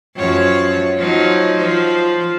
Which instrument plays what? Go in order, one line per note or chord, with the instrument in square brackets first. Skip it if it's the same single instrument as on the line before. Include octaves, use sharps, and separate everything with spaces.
[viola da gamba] F#2 F3 C#5
F3 F#3 D#4
F3